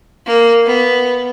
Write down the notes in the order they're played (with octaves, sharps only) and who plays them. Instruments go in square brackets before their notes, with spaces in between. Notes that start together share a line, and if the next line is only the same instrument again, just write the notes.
[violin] A#3
B3